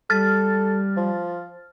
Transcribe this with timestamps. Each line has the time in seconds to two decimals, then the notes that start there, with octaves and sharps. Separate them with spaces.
0.10 G3 A4 F6 A6
0.97 F3